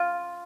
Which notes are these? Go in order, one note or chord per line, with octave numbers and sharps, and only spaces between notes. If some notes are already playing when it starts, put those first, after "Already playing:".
Already playing: F4